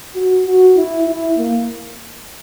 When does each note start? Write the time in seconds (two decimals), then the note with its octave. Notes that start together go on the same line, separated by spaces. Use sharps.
0.15 F#4
0.46 F#4
0.76 E4
1.07 E4
1.38 A#3